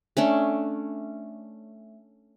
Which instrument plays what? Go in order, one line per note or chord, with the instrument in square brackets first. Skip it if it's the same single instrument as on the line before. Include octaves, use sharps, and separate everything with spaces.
[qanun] A3 C#4 D4